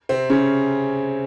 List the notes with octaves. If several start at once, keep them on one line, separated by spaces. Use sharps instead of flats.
C3 C4
C#3 C#4